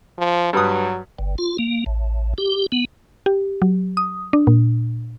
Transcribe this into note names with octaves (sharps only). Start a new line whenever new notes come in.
F3
G2 F#3 B4 D#6
G1
F4
A#3
A1
G4
B3
G4
F#3
D#6
D4
A#2